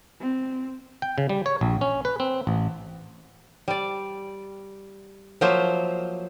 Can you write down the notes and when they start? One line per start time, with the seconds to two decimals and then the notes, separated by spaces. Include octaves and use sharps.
0.21 C4
1.02 G5
1.18 C#3
1.29 G3
1.46 C#5
1.61 A#1
1.81 C#4
2.05 B4
2.20 C4
2.47 A1
3.68 G3 D5
5.41 F3 F#3 A#3 C5 E5